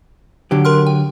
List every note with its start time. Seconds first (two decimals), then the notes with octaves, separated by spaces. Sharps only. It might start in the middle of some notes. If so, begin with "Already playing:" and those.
0.51 D3 F#3 G4
0.65 A#4 C6 F6
0.87 G5